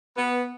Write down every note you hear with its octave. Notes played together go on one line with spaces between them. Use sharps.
B3